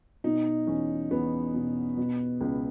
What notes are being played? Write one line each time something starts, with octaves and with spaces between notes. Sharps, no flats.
B2 D#4
E2 C#4
E2 B3
B2
B2
C#2